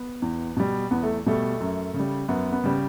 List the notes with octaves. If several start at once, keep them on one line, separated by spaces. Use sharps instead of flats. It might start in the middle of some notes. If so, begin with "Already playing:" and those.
Already playing: B3
E2
B2 G3
E2 B3
A3
B2 G3 A3
F#2
C#3
G3
F#2 B3
B3
C#3 G3